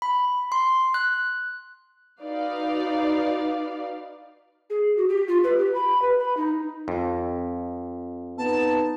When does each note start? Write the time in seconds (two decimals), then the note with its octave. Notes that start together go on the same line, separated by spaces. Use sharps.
0.02 B5
0.52 C6
0.94 F#6
2.21 D#4 F#4 B4 D5 F5
4.70 G#4
4.97 F#4
5.09 G4
5.28 F4
5.44 B4
5.59 G4
5.75 B5
6.02 B4
6.19 B5
6.37 D#4
6.88 F2
8.38 B3 D#4 A5